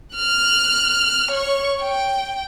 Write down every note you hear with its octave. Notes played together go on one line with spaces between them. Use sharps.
F6 F#6
C#5 C#6
G5